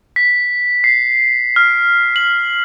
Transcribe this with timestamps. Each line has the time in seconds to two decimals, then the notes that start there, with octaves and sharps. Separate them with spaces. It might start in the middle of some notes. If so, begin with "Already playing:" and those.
0.16 B6
0.84 C7
1.56 F6
2.16 F#7